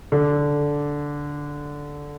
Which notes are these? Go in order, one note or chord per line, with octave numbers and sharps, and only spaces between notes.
D3